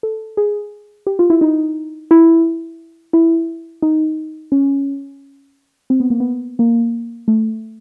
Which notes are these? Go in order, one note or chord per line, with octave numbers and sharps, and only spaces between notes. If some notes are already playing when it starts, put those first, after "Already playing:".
A4
G#4
G4
F4
E4
D#4
E4
E4
D#4
C#4
C4
B3
A#3
B3
A#3
A3